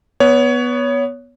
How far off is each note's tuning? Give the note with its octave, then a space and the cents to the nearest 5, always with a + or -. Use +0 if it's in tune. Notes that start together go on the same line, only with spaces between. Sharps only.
B3 -5 C#5 +20